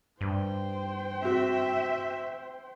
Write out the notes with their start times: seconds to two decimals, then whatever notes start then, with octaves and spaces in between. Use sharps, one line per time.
0.21 G2 C5 G5
1.22 C4 F#4 E5